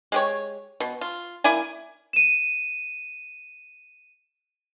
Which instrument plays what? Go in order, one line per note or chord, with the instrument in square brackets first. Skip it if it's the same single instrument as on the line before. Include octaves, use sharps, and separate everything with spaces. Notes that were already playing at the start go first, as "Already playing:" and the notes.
[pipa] G#3 G4 C#5
B2
F4
A#3 E4 D5 G#5
[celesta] D#7 E7